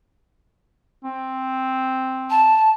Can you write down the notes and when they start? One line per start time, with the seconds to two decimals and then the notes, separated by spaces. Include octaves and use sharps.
1.04 C4
2.30 A5